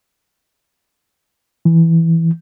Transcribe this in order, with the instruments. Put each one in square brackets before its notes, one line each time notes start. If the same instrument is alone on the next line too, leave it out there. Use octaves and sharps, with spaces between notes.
[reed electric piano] E3